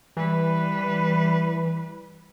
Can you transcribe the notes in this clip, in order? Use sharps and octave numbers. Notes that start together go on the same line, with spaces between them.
E3 G3 B4